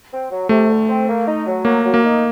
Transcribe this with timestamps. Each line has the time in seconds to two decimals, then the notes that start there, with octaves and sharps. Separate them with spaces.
0.12 C4
0.31 F#3
0.49 C3 A3
0.70 D2
0.89 C4
1.08 A#3
1.27 D#4
1.46 F#3
1.65 F#3 A#3
1.85 F#3
1.94 A#3
2.03 D#4